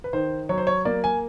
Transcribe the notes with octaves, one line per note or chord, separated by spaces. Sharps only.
B4
D#3 C5
F#3 C#5
C5
C#5
A#3 D5
G#5